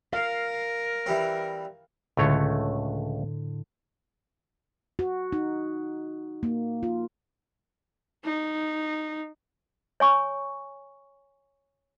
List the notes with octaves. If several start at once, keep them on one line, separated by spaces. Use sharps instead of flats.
A#4 F5
E3 G3 C4
C#2 A2 D3 A3 C#5
F#4
D#4
A#3
F4
D#4
C#5 G#5 C#6